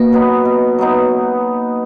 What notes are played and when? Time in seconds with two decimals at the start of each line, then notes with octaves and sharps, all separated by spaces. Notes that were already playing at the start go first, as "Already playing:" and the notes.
Already playing: B2 A#3
0.12 F#3 B3 D#4
0.45 B2
0.79 F#3 B3 D#4